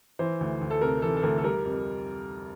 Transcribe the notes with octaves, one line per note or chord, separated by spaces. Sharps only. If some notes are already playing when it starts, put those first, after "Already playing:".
E3 C5
D2
D2
A4
C3 A#4
E3 A4
A4
D2 A#4
A4
G3 A#4
F2